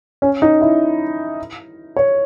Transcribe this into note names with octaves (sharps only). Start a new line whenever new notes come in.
C#4
D#4
E4
C#5